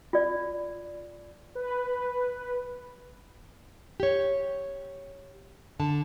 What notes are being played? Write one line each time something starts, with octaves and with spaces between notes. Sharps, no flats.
F4 D5
B4
G4 C#5
D3 A5